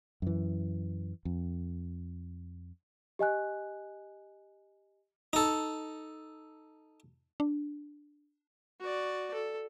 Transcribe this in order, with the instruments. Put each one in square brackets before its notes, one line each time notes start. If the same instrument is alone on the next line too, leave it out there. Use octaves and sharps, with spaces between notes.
[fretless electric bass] F#2 E3
F2
[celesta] G4 D#5 G#5 F#6
[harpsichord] D#4 A4
[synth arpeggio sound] D4
[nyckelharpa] F#4 D5
A4